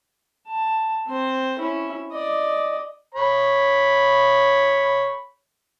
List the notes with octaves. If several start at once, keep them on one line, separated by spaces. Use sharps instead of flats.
A5
C4 C5
C#4 E4
D5 D#5
C#5 B5